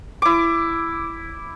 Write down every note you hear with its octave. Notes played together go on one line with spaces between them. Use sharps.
E4 D6